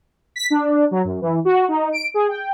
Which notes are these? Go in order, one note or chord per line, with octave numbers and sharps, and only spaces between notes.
B6
D4
F#3
F#2
E3
F#4
D#4
D7
G#4
G5